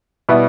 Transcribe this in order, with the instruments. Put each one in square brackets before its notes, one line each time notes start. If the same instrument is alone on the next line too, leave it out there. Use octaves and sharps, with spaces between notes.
[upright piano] B2 G3 B3 E4